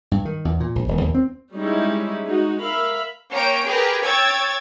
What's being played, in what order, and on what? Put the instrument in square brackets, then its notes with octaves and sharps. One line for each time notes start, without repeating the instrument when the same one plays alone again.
[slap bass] G2
D#3
E2
A#2
A#1
D#1
D#2
C4
[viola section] G3 G#3 C#4 D#4 E4
G#3 D#4 F#4
A#4 E5 F5 B5
[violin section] A#3 C#4 C#5 G5 D7
G4 G#4 A#4 B4 G5
C#5 G5 E6 G#6 A6